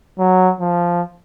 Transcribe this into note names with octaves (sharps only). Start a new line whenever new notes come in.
F#3
F3